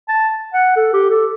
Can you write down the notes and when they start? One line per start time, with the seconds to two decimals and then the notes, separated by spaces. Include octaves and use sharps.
0.08 A5
0.54 F#5
0.76 A4
0.93 G4
1.11 A4